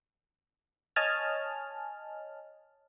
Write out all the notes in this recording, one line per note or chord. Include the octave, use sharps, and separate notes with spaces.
C#5 D#5 G#5 A5 F6